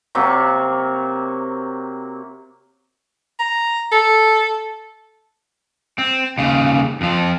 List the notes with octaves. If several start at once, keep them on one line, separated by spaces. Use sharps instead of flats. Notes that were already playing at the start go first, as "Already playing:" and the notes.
C3 F#3 A#3 C#6
A#5
A4
C4
D#2 C#3
F2 F3